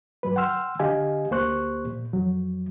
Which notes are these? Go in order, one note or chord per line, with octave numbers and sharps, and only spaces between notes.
G2 F#3 B4
F#5 G5 C6 E6 F6
D3 G4 D#5 F5 G#5
D2 A#3 G4 C5 C#6 F#6
A#2
F2 F#3